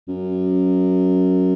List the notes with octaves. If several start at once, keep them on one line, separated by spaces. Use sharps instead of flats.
F#2